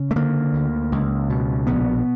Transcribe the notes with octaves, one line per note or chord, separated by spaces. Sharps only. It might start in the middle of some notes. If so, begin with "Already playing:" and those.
Already playing: C#3
A3
D3 A#3
D2
C#2
B2
A#1 B3